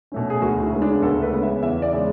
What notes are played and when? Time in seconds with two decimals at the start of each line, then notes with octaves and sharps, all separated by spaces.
0.12 B2 A3 C#4
0.30 G#4
0.42 D2 F#4
0.62 E4
0.72 C#3 G#3 B3
0.82 D4
1.02 D2 A4
1.22 B4
1.32 C#3 G#3 B3
1.43 E5
1.62 E2 E5
1.82 D5
1.93 C#3 G#3